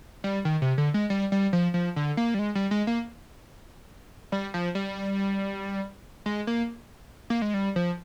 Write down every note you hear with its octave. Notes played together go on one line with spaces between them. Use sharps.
G3
D#3
C3
D3
G#3
G3
G3
F3
F3
D3
A#3
G3
G#3
G3
G#3
A#3
G3
F3
G3
G#3
A#3
A#3
G#3
G3
F3